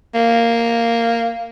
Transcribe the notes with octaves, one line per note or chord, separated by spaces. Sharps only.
A#3